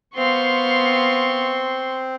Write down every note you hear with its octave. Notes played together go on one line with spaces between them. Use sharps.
B3 C4 F5 C6 C#6